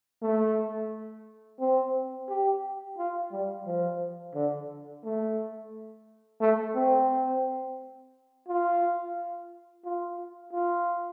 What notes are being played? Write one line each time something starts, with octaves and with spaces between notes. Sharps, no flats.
A3
C4
G4
F4
G3
F3
D3
A3
A3
C4
F4
F4
F4